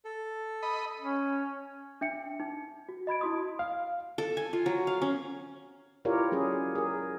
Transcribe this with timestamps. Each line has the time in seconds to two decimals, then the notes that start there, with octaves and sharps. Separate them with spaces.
0.05 A4
0.63 D#5 B5
1.00 C#4
2.01 D4 E5 G5 C#7
2.40 D#4
2.89 F#4
3.07 D#5 B5 G#6 D7
3.21 D#4 E4 F#4 C6 D#6
3.59 F5
4.18 A4
4.37 G#5
4.53 F4
4.66 F#3
4.87 F5
5.02 C#4
6.05 E4 F4 G4 A#4 C#5 D5
6.32 F#3 C#4 G#4
6.75 G#4 A#4